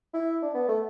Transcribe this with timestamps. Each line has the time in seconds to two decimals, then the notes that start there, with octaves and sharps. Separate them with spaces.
0.14 E4
0.42 D4
0.54 B3
0.68 A3